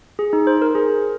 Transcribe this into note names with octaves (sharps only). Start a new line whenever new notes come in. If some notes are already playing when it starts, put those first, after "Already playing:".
G#4
D#4
C5
A#4
G#4